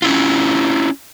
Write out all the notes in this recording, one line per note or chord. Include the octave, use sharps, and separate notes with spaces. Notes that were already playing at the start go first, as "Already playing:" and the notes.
C#4 E4 F4